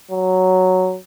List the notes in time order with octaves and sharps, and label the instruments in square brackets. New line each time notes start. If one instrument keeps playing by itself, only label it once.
[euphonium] F#3